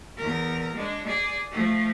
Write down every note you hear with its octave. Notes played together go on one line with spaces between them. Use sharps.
E2 A#4
G#3 D4
G#4 D5
F3 A3